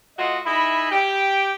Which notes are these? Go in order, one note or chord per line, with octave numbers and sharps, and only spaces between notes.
A3 F4 F#4 D#5
D#4 E4 G#4 E5 B5
G4 G5